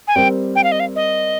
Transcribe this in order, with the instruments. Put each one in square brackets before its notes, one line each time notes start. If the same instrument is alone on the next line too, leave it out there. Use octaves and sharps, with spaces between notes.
[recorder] G#5
[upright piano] G3 C4 G4 A#4 [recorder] G5
[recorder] G5
F5
D#5
F5
D#5